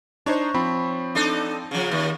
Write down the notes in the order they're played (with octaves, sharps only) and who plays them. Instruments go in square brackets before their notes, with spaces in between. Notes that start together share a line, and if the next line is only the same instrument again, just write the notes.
[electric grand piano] D4 D#4 C5 [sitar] C#5
[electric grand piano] F3 C4 B5
[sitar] D4 D#4 A4
C#3 F3
D#2